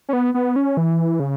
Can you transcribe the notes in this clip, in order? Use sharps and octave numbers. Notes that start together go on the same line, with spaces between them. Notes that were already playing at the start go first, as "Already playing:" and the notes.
C#4
B3
B3
C#4
E3
C#3